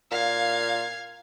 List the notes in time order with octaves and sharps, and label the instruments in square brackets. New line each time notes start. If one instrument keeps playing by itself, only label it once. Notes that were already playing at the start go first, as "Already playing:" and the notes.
[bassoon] A#2 [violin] F5 G#6